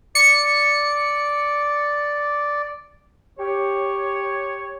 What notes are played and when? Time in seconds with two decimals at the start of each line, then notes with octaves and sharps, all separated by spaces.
0.15 D5 C#7
3.39 G4 C#5